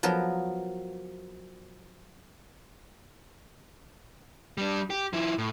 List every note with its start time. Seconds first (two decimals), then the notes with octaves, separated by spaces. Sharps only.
0.03 F3 F#3 B3 A#4
4.58 G3 D4
4.90 G4
5.13 F3 E4
5.38 A2